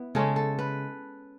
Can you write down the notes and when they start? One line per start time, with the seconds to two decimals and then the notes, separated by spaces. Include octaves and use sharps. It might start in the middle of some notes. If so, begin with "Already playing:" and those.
Already playing: B3 E4
0.15 C#3 G#3 C#4 A4
0.36 A4
0.59 B4